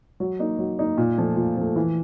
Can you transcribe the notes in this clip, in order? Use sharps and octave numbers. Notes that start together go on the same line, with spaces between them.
F#3
A#3 D#4
F#3
A#3 D#4
A#2
F3 A3
A#2
F3 A3
E3